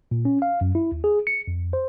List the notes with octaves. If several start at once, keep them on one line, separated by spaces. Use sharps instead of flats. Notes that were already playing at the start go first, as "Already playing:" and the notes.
A#2
C#4
F5
F#2
E4
D#2
G#4
C#7
F2
C5